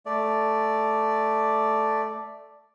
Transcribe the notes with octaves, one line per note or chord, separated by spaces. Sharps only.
A3 D5